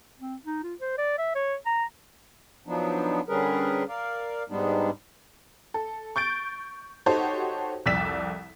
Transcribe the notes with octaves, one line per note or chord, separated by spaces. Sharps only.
C4
D#4
F4
C5
D5
E5
C#5
A#5
F3 F#3 B3 D4 D#4
D3 G3 C#4 G#4 A#4 B4
A#4 D5 F5
G#2 G3 G#3 B3 D4 D#4
A4
C#6 G6 A6 D7
D#4 F#4 G4 A4 C5 C#5
C2 F2 D5 E6 B6 E7